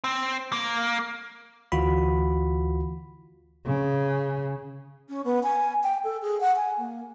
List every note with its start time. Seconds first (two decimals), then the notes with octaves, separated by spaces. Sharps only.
0.04 C4
0.52 A#3
1.72 D2 E3 F4 F#4 B5
3.66 C#3
5.09 C#4
5.24 B3
5.43 G#5
5.84 G5
6.04 A4
6.22 G#4
6.41 F#5
6.56 G#5
6.78 A#3